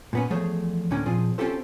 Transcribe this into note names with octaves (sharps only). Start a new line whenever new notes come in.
A#2 B3 C#4
E2 F3 A3 G#4 C5 C#5
D2 A2 A#3 C#4 D4
A#2 F3 C4 G#4
C4 C#4 F4 G4 A4 C5